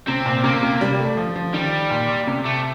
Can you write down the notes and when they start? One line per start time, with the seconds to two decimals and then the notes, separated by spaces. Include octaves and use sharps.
0.07 C3 C4
0.26 A#2
0.44 C3 A#3
0.63 C3
0.81 G3
0.99 A3
1.17 F3
1.35 F3
1.54 D#3 G3
1.90 A#2
2.27 C3
2.45 A3